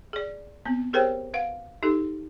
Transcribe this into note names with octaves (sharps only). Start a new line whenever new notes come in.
G#4 D5
B3 C4
G4 G#4 A#4 C5 C#5 G5
B4 F5 F#5
D#4 G4 A4